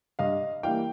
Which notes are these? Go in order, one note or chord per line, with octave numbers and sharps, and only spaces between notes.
G2 D#5 F5
E3 G3 A#3 F5 G5